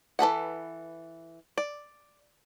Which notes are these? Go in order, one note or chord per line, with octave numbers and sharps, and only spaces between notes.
E3 A4 B4 F#5
D5